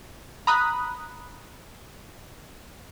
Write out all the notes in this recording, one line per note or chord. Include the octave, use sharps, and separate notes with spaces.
A#5 B5 D#6 F#6